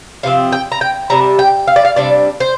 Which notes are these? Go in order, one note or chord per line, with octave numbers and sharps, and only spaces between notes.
C3 F3 C4 F5
G5
A#5
G5
C3 G3 D4 A#5
G5
F5
D5
F5
C3 G3 D4 D5
C5